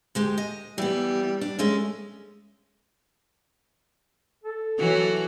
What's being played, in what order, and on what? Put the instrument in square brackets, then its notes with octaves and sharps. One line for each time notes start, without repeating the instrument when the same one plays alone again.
[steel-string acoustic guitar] D2 G#3 G4
D#5
[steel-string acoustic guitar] E3 B3 [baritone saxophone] G3
[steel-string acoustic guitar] D4
G#3 A3 C#4
[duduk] A4
[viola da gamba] E3 F#3 F#4